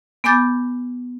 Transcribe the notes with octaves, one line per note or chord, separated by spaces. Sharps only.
B3 G#5 B5 D6 G6 A6